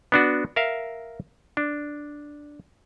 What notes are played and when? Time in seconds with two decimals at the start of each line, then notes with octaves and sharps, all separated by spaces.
0.12 B3 D4 F#4
0.56 A#4 E5 F5
1.57 D4